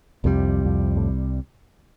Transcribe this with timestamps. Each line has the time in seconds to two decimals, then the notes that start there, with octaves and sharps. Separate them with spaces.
0.24 C2 F2 C3 G3
0.65 F2
0.97 A2